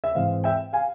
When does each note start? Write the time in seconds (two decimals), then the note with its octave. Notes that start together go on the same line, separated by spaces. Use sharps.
0.04 E5
0.15 G#2 E3 G#3 C4 F5
0.44 E5 G5
0.73 F5 G#5